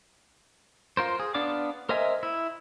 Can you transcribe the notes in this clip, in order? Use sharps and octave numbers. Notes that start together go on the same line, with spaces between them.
F4 A#4 C5
G#4
B3 D4 D5 F5 D6
A#4 C5 D#5 E5 G#5
E4